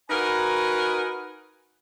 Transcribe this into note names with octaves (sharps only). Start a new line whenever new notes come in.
D#4 F#4 A#4 B4 G#5